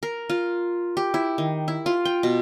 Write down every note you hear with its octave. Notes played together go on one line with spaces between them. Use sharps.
A#4
F4
G4
E4
D#3
E4
F4
G5
B2